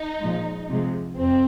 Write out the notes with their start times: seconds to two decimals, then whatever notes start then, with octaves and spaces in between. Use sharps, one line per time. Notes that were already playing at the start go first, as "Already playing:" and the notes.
Already playing: D#4
0.19 A#2 F3 G#3
0.69 C3 F3 G#3
1.17 F2 C4